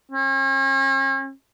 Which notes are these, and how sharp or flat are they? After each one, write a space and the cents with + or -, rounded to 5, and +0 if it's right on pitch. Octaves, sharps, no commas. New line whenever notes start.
C#4 -40